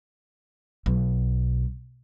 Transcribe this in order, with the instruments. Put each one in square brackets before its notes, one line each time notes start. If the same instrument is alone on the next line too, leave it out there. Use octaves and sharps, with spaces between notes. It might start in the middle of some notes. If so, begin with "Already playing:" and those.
[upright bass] B1